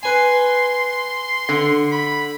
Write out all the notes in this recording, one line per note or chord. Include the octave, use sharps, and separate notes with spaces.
B4 G#5 C6
D3
B5